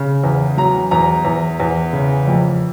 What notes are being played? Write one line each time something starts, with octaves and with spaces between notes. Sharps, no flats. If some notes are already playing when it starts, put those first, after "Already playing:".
Already playing: C#3
E2
F#3 A#5
E2 A#5
E2
E2
C#3
F2